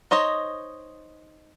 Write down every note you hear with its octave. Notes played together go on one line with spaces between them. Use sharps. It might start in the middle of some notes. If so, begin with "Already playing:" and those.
D#4 C5 C#5 D#5